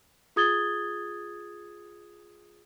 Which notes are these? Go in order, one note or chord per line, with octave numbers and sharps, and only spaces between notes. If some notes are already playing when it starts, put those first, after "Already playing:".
F4 G#4 D#6 G#6 A6 G7